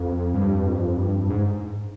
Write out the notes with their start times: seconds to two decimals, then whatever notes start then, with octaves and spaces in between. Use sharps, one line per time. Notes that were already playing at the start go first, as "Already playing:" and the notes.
Already playing: F2
0.34 G2
0.65 F2
0.96 G2
1.29 G#2